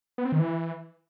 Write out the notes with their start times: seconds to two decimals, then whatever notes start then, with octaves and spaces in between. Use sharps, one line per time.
0.18 B3
0.25 C4
0.32 D#3
0.39 E3